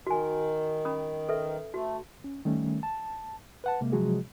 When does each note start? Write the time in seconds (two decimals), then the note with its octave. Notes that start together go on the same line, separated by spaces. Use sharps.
0.07 D#3 F#4 G#5
0.85 C#4 B5 D#6
1.29 A4 B4 E5
1.74 A3 F#4
2.24 C#4
2.45 D#3 G3 A3 C#4
2.83 A5
3.64 B4 F#5 A5
3.81 C3 G#3 A#3
3.92 C3 F3 F#3 G#3 F#4 G#4